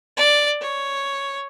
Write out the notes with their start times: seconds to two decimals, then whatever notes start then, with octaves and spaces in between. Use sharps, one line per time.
0.17 D5
0.61 C#5